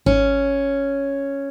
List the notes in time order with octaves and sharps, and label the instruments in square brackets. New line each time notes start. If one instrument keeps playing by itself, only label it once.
[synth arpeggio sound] G#1 [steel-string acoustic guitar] C#4